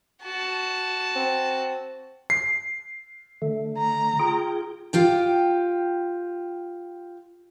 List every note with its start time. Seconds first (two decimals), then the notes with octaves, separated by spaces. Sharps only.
0.23 F#4 A5
1.16 C4
2.30 C7
3.42 D3 A3
3.78 A#5
4.19 F4 G#4 G5
4.93 F4 G4 G5